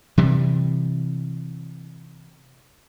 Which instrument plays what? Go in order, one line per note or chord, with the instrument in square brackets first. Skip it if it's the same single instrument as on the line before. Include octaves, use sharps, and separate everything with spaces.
[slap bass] C3 E3 G3